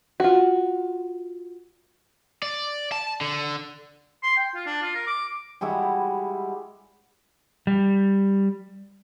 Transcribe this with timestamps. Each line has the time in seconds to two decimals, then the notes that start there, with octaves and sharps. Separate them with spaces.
0.20 F4 F#4
2.42 D5
2.92 A5
3.21 D3
4.23 C6
4.37 G5
4.55 F4
4.66 D4
4.82 F4
4.95 A#4
5.07 D6
5.61 G3 G#3 E4 F#4
7.67 G3